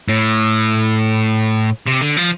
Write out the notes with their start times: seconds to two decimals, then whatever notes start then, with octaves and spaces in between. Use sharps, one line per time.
0.08 A2
1.86 C3
2.01 D3
2.17 F3